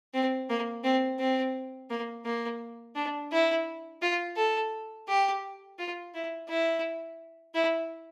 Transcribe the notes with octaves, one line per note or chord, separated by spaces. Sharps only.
C4
A#3
C4
C4
A#3
A#3
D4
E4
F4
A4
G4
F4
E4
E4
E4